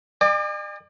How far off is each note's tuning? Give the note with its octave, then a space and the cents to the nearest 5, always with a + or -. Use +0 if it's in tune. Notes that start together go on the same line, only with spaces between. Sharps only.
D5 +45 G#5 -45 D6 +15